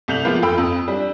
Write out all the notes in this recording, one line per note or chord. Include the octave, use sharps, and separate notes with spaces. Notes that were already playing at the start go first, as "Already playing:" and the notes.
C2 A3 G6 F7 F#7
F3 G#3 A#3 B3 F4
F1 F4 A4 G5 B5 E6
F2
G3 D4